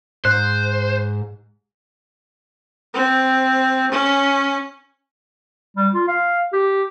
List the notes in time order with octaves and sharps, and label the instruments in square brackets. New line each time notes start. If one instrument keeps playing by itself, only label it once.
[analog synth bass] G#2 [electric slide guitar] C5 [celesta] F#6
[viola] C4
C#4
[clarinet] G3
F4
F5
G4